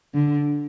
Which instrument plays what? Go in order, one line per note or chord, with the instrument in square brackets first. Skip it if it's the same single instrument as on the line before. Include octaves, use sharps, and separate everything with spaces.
[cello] D3